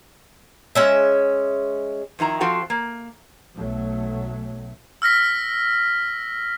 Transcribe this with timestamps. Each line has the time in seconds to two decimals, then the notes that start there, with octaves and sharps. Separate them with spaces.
0.75 G#3 C#4 E5
2.19 F2 D#3 E4 A#5
2.41 F3 C4 F#4 A4 F5
2.70 A#3
3.57 B1 F#3 A3
5.02 E6 F6 A#6 B6